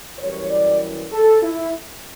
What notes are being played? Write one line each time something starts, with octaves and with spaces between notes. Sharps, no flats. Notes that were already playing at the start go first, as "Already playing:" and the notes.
F#2 E3 G3 C#5
D5
A4
E4